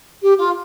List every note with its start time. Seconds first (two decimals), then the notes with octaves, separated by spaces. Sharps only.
0.22 G4
0.37 F4